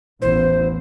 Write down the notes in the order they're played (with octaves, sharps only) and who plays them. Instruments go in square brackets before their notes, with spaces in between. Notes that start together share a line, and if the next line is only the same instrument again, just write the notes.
[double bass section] A1 E2 E3 [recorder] C5